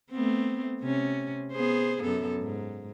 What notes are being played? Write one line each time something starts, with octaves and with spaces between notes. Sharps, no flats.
A3 B3 C4
C3 C#4
B3 G#4 C5
F#2 B3 A4
G#2